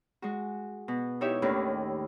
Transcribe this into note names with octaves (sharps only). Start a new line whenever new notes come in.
G#3 F#4
B2
D#4 E4 G4 C#5 E5
D#2 A2 D#3 C#4 D4